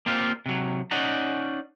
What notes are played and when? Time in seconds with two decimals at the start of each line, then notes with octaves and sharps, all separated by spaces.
0.06 A#3 C4 F4 G4 F5
0.46 C3 F#3
0.91 C#4 D#4 D5 F#5 A#5